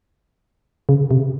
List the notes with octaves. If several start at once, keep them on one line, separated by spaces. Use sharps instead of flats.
C#3
C3